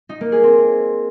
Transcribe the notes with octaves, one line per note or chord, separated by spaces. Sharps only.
D#4
A#3
G#4
C4